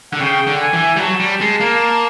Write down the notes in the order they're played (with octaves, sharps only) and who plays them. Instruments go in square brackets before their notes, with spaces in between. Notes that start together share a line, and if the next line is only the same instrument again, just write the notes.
[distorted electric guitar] D3 [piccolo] F#5
[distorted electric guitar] C#3 [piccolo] G5
[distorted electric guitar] D3
[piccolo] G#5
[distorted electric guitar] E3
G3
[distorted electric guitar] F#3 [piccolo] A5
[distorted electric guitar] G3
G#3
A#3